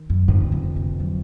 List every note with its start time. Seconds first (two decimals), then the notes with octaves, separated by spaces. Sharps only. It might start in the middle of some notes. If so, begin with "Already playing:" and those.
Already playing: D#3
0.10 F#2
0.28 F2 G#2 D3 F3
0.52 C#3
0.76 C3
1.00 F#3